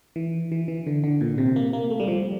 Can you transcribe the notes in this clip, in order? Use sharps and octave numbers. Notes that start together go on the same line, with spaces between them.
E3
E3
E3
D3
D3
A#2
C3
A#3
A#3
A3
G3
F3
G3